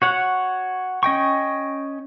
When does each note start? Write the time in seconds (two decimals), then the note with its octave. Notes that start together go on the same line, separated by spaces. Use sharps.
0.02 F#4 C#5 F#5
1.03 C#4 D#5 G5 C#6